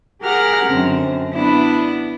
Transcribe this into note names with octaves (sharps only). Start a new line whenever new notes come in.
G4 G#4 A#4 F#5 A#5 F6
F#2 D3 C4
B3 D4 E4